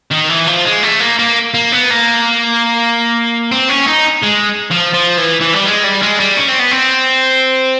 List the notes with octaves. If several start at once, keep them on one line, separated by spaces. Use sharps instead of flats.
D#3
E3
F3
G#3
A3
A#3
A#3
A#3
B3
A#3
C4
C#4
D#4
G#3
F3
F3
E3
E3
G3
G#3
G3
G#3
G3
C#4
C4
B3
C4